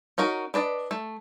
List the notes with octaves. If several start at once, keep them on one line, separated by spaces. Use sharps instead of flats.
C#4 D#4 F#4 A#4
D4 B4 D5 D#5
A3